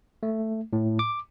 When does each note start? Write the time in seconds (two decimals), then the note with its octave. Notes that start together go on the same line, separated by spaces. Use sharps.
0.23 A3
0.73 A2
0.99 D6